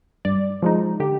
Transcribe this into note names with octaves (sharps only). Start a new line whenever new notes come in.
G2 D5
F3 G#3 D#4
D3 G4